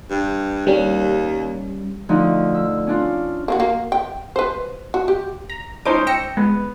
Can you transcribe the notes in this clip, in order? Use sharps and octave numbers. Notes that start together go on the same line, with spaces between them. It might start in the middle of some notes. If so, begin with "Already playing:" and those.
G2
D#2 G3 C#4
D2 F3 D#4
E6
C#4 D4 F4
A#3 F4 F#4
A#3
G5
B4 C5
F#4
G4
A#5
C#4 D#4 C5 D6
G5 E6 A#6 C#7
G#3 B3